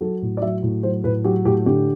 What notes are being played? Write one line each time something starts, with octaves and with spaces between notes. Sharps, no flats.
F#3 A4
A2
D5
F#3 E5
A2
F#3 C5
A2 B4
F#3 G4
A2 G4
D3 G4